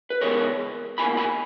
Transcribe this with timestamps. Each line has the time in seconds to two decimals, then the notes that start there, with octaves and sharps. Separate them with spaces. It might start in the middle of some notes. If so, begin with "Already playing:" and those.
0.10 B4
0.21 C#3 E3 G#3 B3 E4 A#4 C#5
0.98 C#2 B2 A#3 E4 G#5 B5
1.17 G#5 B5